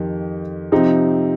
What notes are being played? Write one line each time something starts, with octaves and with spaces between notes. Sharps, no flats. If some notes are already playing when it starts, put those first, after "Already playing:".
Already playing: F2 D#3 G4
C3 F3 C4 D#4 G4